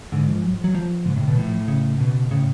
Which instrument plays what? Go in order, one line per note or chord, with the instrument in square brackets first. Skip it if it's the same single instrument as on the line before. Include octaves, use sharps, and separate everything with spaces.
[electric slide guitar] G#2 [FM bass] D3
[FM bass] F3
F#3
F3
F#3
F3
[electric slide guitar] G#2 [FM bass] C#3
[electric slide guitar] A2
[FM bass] D3
[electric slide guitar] B2
[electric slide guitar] A2 [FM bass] F3
[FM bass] C#3
[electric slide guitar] B2
[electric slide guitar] A2 [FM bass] C#3